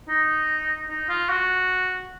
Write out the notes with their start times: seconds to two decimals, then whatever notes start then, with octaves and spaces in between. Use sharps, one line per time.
0.08 D#4
0.89 D#4
1.09 F4
1.29 F#4